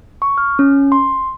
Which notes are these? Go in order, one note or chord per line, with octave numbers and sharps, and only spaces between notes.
C#6
F6
C#4
C6